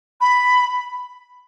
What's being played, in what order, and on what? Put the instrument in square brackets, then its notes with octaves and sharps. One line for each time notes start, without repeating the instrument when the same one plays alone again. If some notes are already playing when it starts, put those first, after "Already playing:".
[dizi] B5